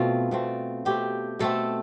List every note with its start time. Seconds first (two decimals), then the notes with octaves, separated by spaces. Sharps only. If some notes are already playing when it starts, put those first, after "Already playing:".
Already playing: B2 A3 C4 F4
0.31 B2 A3 C4
0.85 B2 A3 C4 G4
1.39 B2 A3 C4 A4